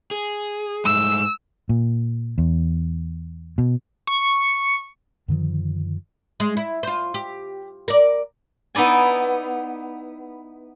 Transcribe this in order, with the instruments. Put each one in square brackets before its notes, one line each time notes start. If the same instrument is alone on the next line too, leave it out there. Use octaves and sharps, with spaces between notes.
[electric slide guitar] G#4
[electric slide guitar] G#2 G#3 A3 [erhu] E6
[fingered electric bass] A#2
E2
B2
[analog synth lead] C#6
[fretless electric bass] F#2 D3 D#3 F3
[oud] G#3
E4
F4 C5
G4
A#4 D5
[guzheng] B3 D#4 E4 D5 G#5